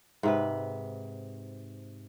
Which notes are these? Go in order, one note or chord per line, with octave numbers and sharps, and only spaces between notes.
G#2 C3 B4